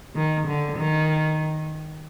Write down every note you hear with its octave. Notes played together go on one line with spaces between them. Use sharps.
D#3
D3
D#3